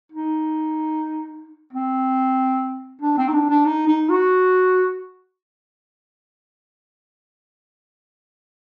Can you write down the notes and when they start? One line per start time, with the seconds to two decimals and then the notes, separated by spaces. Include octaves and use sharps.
0.12 D#4
1.73 C4
3.01 D4
3.17 C4
3.28 D#4
3.34 D4
3.49 D4
3.65 D#4
3.87 D#4
4.09 F#4